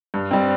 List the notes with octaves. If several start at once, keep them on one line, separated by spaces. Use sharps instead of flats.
G2
G3 C4